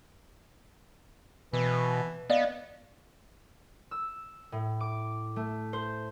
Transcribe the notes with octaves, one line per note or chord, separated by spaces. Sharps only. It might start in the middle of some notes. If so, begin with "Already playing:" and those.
B2 E3
B3 D5 D#5 F5
E6
A2
D6
A3
C5